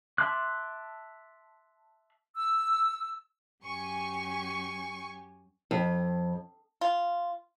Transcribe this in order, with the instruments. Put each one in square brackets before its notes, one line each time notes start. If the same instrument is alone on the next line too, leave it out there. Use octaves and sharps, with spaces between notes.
[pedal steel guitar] E5 A5 C6 D6 F#6
[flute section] E6
[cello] F#2 G4 [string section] G#5 C#6
[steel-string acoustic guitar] F2
[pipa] F4